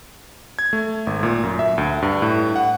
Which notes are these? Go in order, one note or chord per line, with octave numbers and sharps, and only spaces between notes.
G#6
A3
G#1
A#2
F#2
E5
D2
G2
A2
F#5